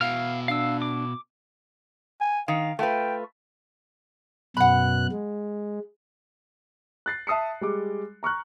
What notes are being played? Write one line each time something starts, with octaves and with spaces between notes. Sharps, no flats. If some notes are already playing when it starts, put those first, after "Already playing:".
B2 E4 F5 F6
D4 F5 E6
D6
G#5
D#3 F5
A3 F4 B4 G5
F#2 B2 F#5 B5 F#6
G#3
F#6 A6 C7
E5 A5 D#6 C7 C#7
G3 G#3 D6
A#5 C#6 F6 F#6